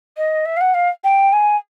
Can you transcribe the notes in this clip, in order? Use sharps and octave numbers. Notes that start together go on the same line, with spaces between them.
D#5
E5
F5
F#5
F5
G5
G#5